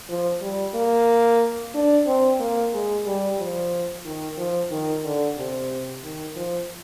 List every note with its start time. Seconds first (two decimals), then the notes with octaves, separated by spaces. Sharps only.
0.09 F3
0.41 G3
0.74 A#3
1.74 D4
2.06 C4
2.40 A#3
2.73 G#3
3.06 G3
3.39 F3
4.05 D#3
4.38 F3
4.71 D#3
5.05 D3
5.38 C3
6.04 D#3
6.36 F3